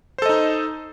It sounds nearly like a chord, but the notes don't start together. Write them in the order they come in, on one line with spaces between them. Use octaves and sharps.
C5 A4 D#5 D#4